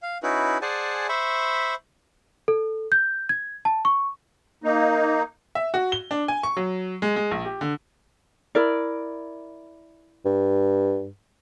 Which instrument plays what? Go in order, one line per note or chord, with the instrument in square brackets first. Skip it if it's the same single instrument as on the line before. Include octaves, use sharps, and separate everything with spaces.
[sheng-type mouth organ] F5
C#4 D#4 E4 F#4 B4
G#4 C5 D5 F#5 G#5 A5
C5 E5 B5 C#6
[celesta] A4
G6
G#6
A5
C#6
[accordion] A#3 D#4
[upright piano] E5
F#4
G7
D4
G#5
C#6
F#3
G#3
G#3
A#1
G4
D3
[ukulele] E4 A#4 D5
[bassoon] G2